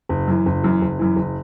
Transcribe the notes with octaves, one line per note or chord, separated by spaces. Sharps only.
F#1
F#2 E3
F#1
F#2 E3
F#1
F#2 E3
F#1